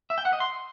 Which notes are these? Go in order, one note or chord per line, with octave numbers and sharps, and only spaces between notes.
E5
G5
F#5
D#5
C6